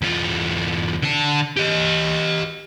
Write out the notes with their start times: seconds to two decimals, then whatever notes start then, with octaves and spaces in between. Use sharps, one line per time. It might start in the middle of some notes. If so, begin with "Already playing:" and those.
0.02 E2 F4
1.02 D3 A5
1.57 G4 D#5